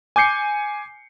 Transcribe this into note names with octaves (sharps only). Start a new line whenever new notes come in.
G#5 D6 G6 C7 C#7